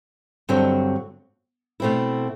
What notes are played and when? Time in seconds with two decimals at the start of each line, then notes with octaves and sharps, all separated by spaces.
0.49 G2 D3 F#3 C4
1.80 B2 A3 C4 E4